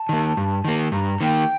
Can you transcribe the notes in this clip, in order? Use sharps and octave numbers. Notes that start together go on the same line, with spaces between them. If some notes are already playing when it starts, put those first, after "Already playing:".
Already playing: A5
D#3 A#3
G2
D#3 A#3
G2 A#5
D#3 A#3 G5